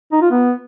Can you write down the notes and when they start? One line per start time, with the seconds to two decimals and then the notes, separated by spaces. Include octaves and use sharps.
0.12 D#4
0.22 F4
0.31 B3